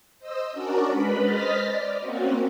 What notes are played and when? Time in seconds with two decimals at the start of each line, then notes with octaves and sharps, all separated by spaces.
0.19 C5 D#5 E6
0.52 C#4 D4 F#4 A#4 D5
0.87 G#3 B4 B5
1.21 C5 D#5 F6 A6 B6
1.68 D5
2.00 A#3 C4 C#4 F#4